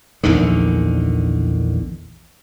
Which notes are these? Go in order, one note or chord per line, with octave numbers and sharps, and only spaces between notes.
A#1 E2 D3 D#3